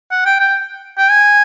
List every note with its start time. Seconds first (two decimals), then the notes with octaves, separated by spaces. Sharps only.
0.11 F#5
0.26 G5
0.40 G5
0.97 G5
1.11 G#5